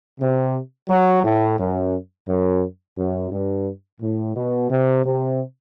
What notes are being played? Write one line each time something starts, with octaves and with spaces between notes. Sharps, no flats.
C3
F#3
A2
F#2
F#2
F#2
G2
A2
B2
C3
C3